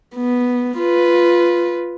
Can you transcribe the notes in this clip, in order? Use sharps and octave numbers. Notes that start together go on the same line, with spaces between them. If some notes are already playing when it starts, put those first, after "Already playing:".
B3
F4 B4